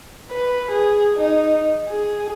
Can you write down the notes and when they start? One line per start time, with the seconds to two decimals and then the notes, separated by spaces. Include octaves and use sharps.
0.31 B4
0.71 G#4
1.17 D#4
1.89 G#4